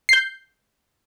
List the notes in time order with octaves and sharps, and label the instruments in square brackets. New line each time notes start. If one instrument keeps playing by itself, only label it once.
[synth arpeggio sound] G6 C7